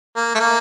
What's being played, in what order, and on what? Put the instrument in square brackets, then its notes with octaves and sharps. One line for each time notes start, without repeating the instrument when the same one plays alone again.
[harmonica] A#3
A3
A#3